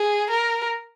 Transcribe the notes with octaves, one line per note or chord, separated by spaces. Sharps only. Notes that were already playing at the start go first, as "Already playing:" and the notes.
Already playing: G#4
A#4